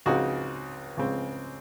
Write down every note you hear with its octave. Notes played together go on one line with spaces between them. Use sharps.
C#2 C#3 G#3 C4 D#4 F#4
C#2 C#3 G#3 C4